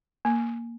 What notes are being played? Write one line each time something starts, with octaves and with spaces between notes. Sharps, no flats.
A#3